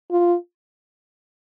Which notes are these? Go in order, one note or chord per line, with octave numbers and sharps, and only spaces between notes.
F4